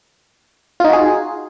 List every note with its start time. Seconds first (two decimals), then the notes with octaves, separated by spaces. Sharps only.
0.80 F4
0.84 D#4
0.89 F#4
0.93 G#4